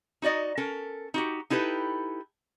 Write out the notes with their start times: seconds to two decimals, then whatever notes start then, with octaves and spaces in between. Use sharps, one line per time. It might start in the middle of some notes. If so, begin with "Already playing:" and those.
0.22 D#4 F#4 D5 D#5 A#5
0.57 C#4 A4 A#4
1.14 D#4 F#4 G4
1.50 D#4 E4 G4 A4 B4